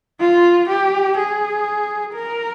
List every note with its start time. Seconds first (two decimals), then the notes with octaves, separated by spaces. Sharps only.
0.21 F4
0.69 G4
1.18 G#4
2.15 A#4